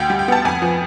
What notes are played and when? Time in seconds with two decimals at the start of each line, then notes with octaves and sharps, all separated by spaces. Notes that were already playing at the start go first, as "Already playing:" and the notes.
Already playing: D2 G5
0.10 G3
0.19 G5
0.28 B3 A5
0.45 F2 G#5
0.62 F3